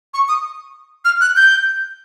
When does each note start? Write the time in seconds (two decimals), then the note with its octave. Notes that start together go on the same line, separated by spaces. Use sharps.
0.14 C#6
0.28 D#6
1.05 F6
1.21 F#6
1.36 G6